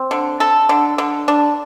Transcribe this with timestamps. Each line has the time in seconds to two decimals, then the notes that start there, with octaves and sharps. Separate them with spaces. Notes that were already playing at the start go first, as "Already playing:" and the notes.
Already playing: C4
0.11 D3
0.40 A4
0.69 D3
0.98 D3
1.28 D4